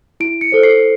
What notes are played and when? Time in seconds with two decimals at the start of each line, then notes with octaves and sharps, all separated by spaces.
0.20 E4 D7
0.41 C#7
0.52 A4 C5
0.63 C7